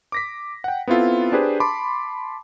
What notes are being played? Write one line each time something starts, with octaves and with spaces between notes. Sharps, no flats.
D6 A#6 B6
F#5 G5
B3 C4 E4 F4 A4
D4 G4 G#4 B4 C5
A5 B5 C6 D6